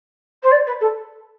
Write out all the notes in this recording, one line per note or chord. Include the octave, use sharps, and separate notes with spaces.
C5
D5
B4
A4